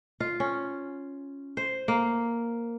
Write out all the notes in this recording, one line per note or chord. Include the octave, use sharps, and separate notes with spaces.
F4
C#4
C5
A#3